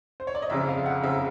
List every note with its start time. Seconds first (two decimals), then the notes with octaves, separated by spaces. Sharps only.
0.20 C5
0.27 C#5
0.35 D5
0.42 D#5
0.50 F#1 F2 C#3 E5
0.68 F5
0.86 F#5
1.03 F#1 F2 C#3 E5